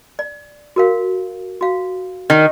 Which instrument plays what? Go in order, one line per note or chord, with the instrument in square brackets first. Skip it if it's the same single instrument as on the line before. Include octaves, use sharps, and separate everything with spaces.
[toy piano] D5
F#4 A#4 F5
F#4 F5
[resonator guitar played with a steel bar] D#3